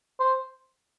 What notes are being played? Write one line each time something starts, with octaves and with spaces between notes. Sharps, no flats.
C5